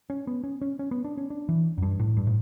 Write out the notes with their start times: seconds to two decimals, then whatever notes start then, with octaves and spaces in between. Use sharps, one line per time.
0.10 C#4
0.27 B3
0.44 C#4
0.61 C#4
0.79 C#4
0.91 B3
1.04 D4
1.17 C#4
1.30 D4
1.49 E3
1.78 F#2
1.82 G2
1.99 A2
2.17 G2
2.27 A2